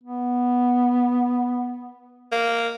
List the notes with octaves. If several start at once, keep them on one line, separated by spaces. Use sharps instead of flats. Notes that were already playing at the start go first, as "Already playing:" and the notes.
B3
A#3